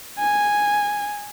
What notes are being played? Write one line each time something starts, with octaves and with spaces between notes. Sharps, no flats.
G#5